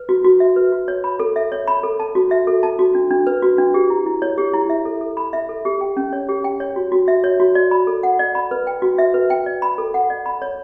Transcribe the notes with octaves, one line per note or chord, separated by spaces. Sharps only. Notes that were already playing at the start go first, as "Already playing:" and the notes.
Already playing: B4
F#4
F#4
E5
B4
F#4
C#5
B5
A4
E5
C#5
B5
A4
A5
F#4
E5
A4
A5
F#4
D4
D4
B4
F#4
D4
G4
E4
E4
C#5
G4
E4
E5
A4
A4
B5
E5
A4
G4
G5
C#4
C#5
G4
G5
C#5
F#4
F#4
E5
C#5
F#4
D5
B5
A4
F#5
D5
B5
B4
G5
F#4
E5
B4
G5
D5
B5
A4
F#5
D5
B5
C#5